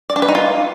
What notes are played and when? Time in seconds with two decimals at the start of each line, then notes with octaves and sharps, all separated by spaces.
0.10 D5
0.16 D4
0.22 B4
0.28 D#4
0.35 F4